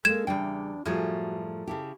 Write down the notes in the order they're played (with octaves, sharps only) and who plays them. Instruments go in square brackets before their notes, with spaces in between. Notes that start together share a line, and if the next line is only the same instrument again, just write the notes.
[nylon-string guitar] G#3 A#3 [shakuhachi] A4 [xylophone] G#6 E7
[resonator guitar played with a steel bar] E2 G5 [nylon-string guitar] C#3 G3 [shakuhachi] D4
[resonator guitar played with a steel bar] F#2 A3 G#4 [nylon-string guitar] A2 F3 G3 [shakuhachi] F#4
[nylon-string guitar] C#3 E4 G4 [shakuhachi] A5